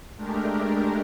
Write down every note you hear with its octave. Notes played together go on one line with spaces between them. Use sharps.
G#3 A3 D4 G4 A#4